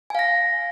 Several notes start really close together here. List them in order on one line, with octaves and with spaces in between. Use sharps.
G#5 F5 A#6